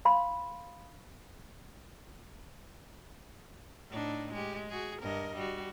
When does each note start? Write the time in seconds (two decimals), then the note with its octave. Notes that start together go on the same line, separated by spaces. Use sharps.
0.05 F5 B5 C6
3.90 A2 D4 D#4
4.33 G#3 G4
4.69 F#4 G#4
5.01 G2 A#4 D#5
5.36 G3 F#4